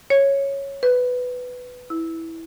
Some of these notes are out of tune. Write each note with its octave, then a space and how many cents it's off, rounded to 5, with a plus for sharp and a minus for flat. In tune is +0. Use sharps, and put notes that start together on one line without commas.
C#5 -5
B4 +10
E4 -10